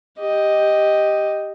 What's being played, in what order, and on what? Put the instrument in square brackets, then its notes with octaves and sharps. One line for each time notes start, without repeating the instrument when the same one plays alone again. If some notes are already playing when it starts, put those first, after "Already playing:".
[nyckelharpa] G4 D#5